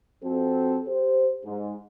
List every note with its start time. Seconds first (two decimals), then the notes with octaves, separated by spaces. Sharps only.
0.23 F2 C4 F#4 A4
0.87 G4 C5
1.45 G#2